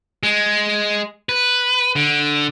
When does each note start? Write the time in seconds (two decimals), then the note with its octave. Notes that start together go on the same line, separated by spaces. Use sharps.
0.23 G#3
1.29 B4
1.96 D3